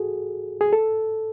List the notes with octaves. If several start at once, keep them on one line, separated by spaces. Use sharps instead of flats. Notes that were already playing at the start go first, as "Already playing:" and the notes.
Already playing: F#4 G#4 A4
G#4
A4